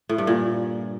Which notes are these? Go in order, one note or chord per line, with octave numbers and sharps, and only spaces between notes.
A2
G2
A#2